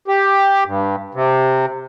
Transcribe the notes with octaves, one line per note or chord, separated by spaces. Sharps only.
G4
G2
C3